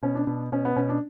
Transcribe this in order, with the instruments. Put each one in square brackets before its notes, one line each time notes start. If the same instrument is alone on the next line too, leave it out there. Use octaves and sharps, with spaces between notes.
[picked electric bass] B2 [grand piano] C#4
[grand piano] D4
[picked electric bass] B2 [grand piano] D4
[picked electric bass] B2 [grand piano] C#4
[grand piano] B3
[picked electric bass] B2 [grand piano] C#4
[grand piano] D4